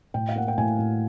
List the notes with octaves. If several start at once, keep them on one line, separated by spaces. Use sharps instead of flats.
A2 G5
F5
A#3 F#5
G5
A2 G#5
A2